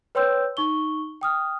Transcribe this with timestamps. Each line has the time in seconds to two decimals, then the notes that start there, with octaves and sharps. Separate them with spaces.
0.15 B4 C#5 G5 C6 E6 G6
0.57 D#4 C#6 G7
1.21 G5 D#6 F6